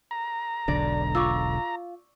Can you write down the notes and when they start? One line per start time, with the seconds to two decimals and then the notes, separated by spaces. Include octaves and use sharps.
0.11 A#5
0.68 E1 B1 D3 D5 A#6
1.15 F4 C#6 D6 E6